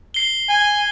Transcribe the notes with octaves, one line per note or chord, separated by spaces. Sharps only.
C7 G7
G#5